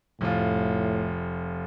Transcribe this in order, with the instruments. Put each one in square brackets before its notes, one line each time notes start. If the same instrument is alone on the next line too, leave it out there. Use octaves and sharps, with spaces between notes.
[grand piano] F1 F4 [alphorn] A2